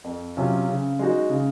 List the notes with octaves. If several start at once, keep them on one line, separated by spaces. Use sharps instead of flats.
F2
C3 F#3 C#4 F4
C#3
G#3 D#4 F#4
C#3